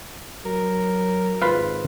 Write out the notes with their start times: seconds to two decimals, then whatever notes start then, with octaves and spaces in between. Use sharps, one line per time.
0.46 F#3 A#4
1.42 G#1 F4 B4 F5